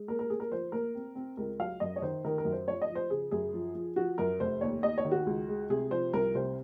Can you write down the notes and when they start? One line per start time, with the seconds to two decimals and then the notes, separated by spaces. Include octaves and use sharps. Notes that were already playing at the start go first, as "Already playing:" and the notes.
Already playing: G#3
0.08 A#3 A#4
0.19 A#4
0.30 A#3 G#4
0.40 A#4
0.52 F3 C5
0.72 A#3 A#4
0.95 C4
1.15 C4
1.37 C#2 A#4
1.59 F#3 F5
1.80 F#2 D#5
1.96 C#5
2.02 D#3 C5
2.24 D#3 A#4
2.38 A#4
2.45 F#2
2.52 C5
2.68 F3 C#5
2.82 D#5
2.89 F3
2.95 C5
3.10 C#3 G#4
3.31 F#2 G#4
3.53 F3
3.75 F3
3.96 F3 F#4
4.18 F#2 A#4
4.40 F1 C5
4.61 D#2 C#5
4.83 D#2 D#5
4.98 C#5
5.05 D#3
5.12 F#4
5.26 C#2
5.49 G#3
5.70 C3 G#4
5.91 F3 C5
6.13 C2 A#4
6.35 C3 C5